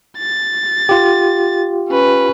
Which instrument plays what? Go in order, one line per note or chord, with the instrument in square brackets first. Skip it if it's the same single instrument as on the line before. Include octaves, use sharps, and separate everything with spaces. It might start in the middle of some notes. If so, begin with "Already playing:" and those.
[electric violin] A6
[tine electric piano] F4 G4
[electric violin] C#4 B4